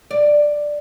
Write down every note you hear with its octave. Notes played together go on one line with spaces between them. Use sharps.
D5